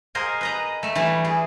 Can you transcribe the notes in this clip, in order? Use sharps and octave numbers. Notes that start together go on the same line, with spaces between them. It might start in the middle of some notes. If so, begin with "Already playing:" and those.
G#4 A#4 C5 D#5 G#5
B4 D#5 A#5
A3 E5
E3 G3 A3
G#4